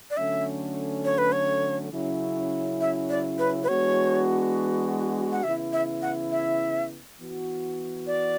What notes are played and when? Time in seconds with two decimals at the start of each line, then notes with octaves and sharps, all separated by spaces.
0.10 D5
0.17 D3 F#3 A3 C#4 E5
1.04 C#5
1.18 B4
1.32 C#5
1.92 C#3 F#3 C#4 E4
2.81 E5
3.09 D5
3.38 B4
3.64 B4
3.68 E3 G#3 B3 D4 F#4 C#5
5.32 F#5
5.43 C#3 E3 B3 E4 E5
5.73 E5
6.02 F#5
6.31 E5
7.19 E3 B3 F#4
8.07 D5